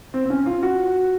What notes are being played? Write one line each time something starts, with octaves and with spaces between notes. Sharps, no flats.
C4
C4
C#4
F4
F#4